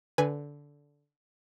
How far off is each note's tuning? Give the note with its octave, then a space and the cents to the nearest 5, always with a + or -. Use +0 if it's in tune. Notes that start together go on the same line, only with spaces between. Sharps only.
D3 -15 B4 +0 G#5 +0